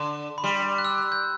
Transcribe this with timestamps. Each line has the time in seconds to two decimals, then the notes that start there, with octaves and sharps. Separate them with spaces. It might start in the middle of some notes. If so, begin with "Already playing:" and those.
Already playing: D3
0.38 B5
0.44 G3 C6
0.78 F#6
0.85 E6
0.98 F#6
1.12 G6